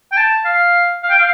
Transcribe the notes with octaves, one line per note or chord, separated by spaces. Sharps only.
G5
A5
F5
F5
G5
F5